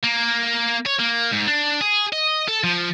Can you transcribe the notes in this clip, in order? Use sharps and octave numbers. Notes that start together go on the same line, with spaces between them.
A#3
C#5
A#3
G#2
D4
G#4
D#5
A4
F3